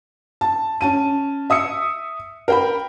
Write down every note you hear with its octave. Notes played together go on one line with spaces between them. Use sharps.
A5
C#4 A5 D#7
E5 D#6 E6 C#7
A#4 G5 B5